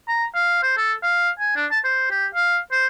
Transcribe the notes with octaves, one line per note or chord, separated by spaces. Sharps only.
A#5
F5
C5
A4
F5
G#5
D4
A5
C5
G4
F5
C5